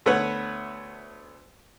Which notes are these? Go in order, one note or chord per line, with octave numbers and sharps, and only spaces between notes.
D2 A3 B3 B4 C#5 F#5